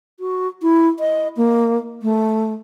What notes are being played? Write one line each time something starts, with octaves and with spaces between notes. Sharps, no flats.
F#4
E4
D#5
A#3
A3